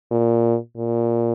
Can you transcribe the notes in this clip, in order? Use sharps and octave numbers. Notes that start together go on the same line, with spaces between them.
A#2
A#2